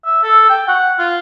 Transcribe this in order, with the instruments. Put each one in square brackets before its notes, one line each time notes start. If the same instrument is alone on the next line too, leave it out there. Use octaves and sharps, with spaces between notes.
[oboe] E5
A4
G5
F#5
F4